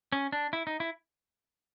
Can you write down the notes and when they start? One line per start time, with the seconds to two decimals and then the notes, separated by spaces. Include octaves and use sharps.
0.12 C#4
0.32 D4
0.53 E4
0.67 D#4
0.80 E4